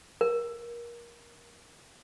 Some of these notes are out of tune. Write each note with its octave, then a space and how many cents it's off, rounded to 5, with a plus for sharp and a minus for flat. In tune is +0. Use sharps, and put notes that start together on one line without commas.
A#4 +25